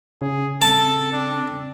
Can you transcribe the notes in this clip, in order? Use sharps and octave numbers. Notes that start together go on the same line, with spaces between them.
C#3 G#4
C4 A4 A5
D4